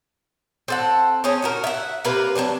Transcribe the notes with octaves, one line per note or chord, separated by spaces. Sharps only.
C4 A4 F#5
C4 C#4 G#4 A#5
D#4 F#4 A#4
E5 F#5
C3 A#3 A#4 B4
F#3 A#3 C4 D4